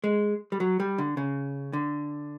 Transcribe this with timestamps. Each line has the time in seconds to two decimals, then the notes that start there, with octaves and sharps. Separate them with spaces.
0.04 G#3
0.52 G3
0.60 F#3
0.80 G3
0.98 D3
1.17 C#3
1.73 D3